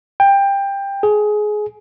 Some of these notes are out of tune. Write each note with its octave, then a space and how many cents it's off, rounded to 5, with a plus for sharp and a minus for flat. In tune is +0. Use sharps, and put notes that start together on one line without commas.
G5 +20
G#4 +20